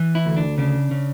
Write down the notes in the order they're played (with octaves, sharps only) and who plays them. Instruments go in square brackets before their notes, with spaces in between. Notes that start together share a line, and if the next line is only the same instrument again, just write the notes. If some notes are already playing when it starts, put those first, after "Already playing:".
Already playing: [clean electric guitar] E3
E4
D2
D4
C#3 D4
C#3